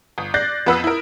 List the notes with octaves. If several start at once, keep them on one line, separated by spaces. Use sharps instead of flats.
G1
D5 F#6 G6 A6 A#6 C7
F2 B3 B4 D#6 E6
E4 A#4